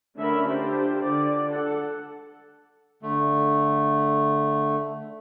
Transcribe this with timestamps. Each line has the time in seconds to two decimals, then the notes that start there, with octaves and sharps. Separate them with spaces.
0.18 D3 A3 C#4 A#4 E5 B5
0.47 D4 F4 G4 C5
1.02 D3 D5
1.48 A4 F#5
3.03 D3 A3